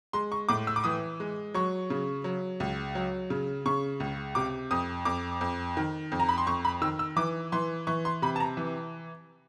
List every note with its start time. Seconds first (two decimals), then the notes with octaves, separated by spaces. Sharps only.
0.13 G#3 C6
0.32 C#6
0.49 A2 D6
0.67 E6
0.76 D6
0.84 E3 D#6
1.20 G#3
1.54 F#3 C#6
1.90 C#3
2.24 F#3
2.60 C#2
2.95 F#3
3.30 C#3
3.66 C#3 C#6
4.00 C#2
4.35 C3 D6
4.71 F2 D#6
5.05 F2 D6
5.41 F2
5.77 D#3
6.12 F2
6.20 A#5
6.29 B5
6.38 C6
6.47 F2 C#6
6.65 B5
6.82 D#3 E6
6.99 E6
7.16 E3 D6
7.52 E3 C6
7.87 E3 C#6
8.05 C6
8.22 C3 B5
8.36 A5
8.40 A#5
8.57 E3